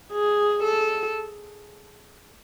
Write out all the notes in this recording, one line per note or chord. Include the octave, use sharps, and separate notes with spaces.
G#4
A4